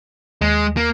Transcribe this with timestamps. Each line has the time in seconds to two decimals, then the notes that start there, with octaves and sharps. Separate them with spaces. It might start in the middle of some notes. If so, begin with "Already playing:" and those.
0.41 D#2 G#3
0.77 A#3